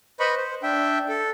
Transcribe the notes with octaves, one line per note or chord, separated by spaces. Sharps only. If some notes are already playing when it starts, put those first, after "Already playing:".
B4 C5 D#5 B5 C#6
C5
D4 E5 G5
A4